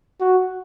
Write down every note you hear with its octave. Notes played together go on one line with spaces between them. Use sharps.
F#4